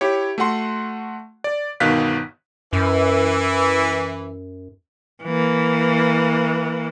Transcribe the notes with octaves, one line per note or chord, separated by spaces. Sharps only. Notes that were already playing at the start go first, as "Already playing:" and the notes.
E4 G4 C#5
A3 F#4 F#5 C6
D5
G1 B2 D#3 F5 F#6 B6
F#2 E3
E3 A#3